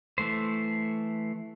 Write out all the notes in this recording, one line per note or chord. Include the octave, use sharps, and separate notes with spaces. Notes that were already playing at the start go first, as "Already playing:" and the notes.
E3 A3 C5